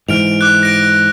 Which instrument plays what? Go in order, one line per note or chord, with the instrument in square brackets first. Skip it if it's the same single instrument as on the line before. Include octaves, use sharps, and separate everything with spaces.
[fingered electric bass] G#2 E3 [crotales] F6 D7 F7
[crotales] D6 F#6
A#6 D7